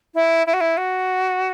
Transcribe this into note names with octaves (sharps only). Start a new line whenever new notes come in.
E4
E4
F#4
E4
F#4